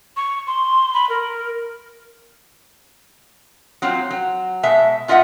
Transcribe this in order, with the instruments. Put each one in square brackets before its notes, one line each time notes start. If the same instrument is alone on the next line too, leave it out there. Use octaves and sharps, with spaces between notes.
[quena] C#6
C6
B5
A#4
[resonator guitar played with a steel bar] F#3 C4 F4
F#3
B2 G#3 E5 A5
A#2 F4 D#5 E5 F#5